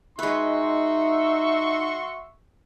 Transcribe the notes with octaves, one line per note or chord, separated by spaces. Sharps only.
G#3 D#4 F#4 B4 E5 C6 C#6